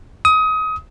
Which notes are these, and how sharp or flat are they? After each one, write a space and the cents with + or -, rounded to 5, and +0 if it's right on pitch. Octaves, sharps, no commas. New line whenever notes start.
D#6 +25